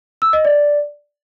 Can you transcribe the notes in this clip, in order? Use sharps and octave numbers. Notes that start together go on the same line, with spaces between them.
E6
D#5
D5